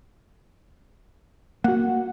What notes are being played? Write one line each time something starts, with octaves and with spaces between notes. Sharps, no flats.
A#3 F#4 F#5